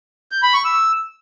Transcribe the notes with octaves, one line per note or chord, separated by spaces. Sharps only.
G6
B5
C#6
E6